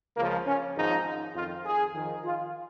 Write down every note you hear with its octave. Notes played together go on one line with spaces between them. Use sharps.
C#2 C#3 F3 A#3
C#4
G#1 G#2 F3 D#4
F2 D#3 F4
G#4
F2 D#3
F4